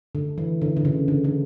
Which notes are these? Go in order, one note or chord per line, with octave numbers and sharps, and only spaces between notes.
D3
E3
D3
D3
C#3
D3
D3